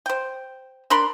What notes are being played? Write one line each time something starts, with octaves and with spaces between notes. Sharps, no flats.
C5 G5
D4 A#4 B5 C6